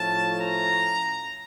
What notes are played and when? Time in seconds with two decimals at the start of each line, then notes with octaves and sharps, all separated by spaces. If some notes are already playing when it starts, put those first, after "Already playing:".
Already playing: A2 F3 A3 C#4 A5
0.39 A#5